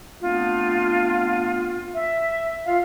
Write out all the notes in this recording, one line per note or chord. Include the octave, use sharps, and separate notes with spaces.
A3 B3 C4 D4 F4
E5
F4 F5